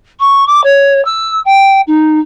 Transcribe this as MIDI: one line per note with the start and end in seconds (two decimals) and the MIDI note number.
0.19 0.44 85
0.46 0.61 86
0.64 1.03 73
1.05 1.40 88
1.45 1.81 79
1.87 2.19 63